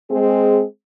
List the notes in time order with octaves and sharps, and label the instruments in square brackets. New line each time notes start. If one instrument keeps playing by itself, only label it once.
[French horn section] G#3 C4 G#4